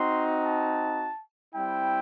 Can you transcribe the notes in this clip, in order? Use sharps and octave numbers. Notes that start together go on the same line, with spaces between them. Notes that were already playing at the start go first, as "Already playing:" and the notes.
Already playing: C4 D#4 F#4 C6
A5
G3 C4 E4 G5